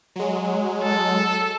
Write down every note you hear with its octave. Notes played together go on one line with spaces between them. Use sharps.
F#3 G#3
A4